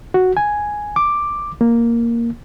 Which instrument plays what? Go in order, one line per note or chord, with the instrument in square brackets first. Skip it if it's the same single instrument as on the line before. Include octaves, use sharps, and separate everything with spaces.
[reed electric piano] F#4
G#5
D6
A#3